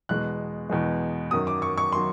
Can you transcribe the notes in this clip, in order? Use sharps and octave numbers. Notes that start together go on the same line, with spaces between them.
E2 B2 G#3 F#6
E2 B2 G#3
F#2 D#3 F#3 D#6
D6
C#6
C#6
D#3 F#3 C6